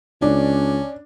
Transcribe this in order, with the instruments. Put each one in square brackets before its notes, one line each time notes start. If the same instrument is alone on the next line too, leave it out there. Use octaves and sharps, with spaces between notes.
[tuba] C#2 [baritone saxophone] C#4 [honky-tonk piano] D4